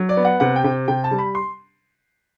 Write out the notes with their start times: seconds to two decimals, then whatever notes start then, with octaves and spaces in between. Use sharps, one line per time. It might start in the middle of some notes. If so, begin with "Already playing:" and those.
Already playing: F#3
0.09 D5
0.17 B3
0.25 F#5
0.40 C3 F#5
0.56 G5
0.64 C3
0.88 C3 G5
1.04 A5
1.11 G3
1.19 B5
1.35 C6